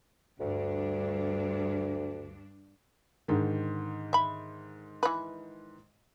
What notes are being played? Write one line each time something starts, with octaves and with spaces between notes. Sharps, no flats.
D2 G2 D4
G#2 D3 D#3
E5 B5
E3 B4